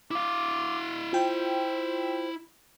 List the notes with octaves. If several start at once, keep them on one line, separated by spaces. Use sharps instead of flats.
E4 F5 D6
F4 C5 G5